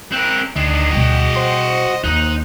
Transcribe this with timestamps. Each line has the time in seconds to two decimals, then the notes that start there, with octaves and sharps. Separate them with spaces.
0.12 C4 A#4 F#6
0.56 D2 D#3 D4 D#5
0.91 B2 G3 F#4 G5
1.36 C5 C6
2.04 D#2 D#4 F#6